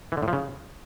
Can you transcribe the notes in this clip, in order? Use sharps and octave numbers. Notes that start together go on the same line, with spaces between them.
E3
D3
A2
F3
C#3